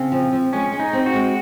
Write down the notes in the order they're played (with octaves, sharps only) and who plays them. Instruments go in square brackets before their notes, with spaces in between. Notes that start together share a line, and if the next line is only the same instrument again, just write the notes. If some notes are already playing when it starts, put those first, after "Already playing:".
Already playing: [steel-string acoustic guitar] C#3 [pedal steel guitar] C4
[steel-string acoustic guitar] F3
F3
[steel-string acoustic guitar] G#3 [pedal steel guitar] C#4
[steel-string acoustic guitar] G#3
[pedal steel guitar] D#4
[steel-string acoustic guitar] C4
[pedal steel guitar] F#4
[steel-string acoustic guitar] G#3